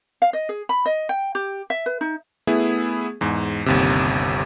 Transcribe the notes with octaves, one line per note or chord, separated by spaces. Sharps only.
F5
D#5
G#4
B5
D#5
G5
G4
E5
B4
D#4
A3 B3 E4 G#4
E2 G#2
G1 D#2 C3